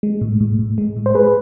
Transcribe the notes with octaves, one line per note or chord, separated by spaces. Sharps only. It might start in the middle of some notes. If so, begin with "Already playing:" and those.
G#3
A2
A2
A2
G#3
A2
C5
G#3 G#4 B4